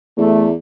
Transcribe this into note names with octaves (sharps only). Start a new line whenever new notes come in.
E2 A3